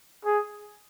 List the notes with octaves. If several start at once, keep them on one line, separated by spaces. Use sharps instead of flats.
G#4